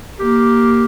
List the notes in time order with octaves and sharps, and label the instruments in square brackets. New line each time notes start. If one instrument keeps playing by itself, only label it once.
[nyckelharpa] A#3 [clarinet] G4